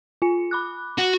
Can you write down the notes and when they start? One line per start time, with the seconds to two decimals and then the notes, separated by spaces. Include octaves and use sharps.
0.22 F4 G#5 C#7
0.51 B5 D6 F#6
0.98 F#4